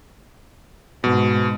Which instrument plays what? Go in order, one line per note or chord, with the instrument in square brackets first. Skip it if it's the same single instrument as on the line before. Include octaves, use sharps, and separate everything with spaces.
[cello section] G#2 G#3 [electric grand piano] B2